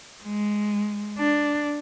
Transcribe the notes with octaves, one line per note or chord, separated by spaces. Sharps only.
G#3
D4